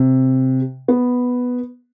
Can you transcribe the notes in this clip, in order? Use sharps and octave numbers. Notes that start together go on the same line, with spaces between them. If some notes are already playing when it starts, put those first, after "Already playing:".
Already playing: C3
B3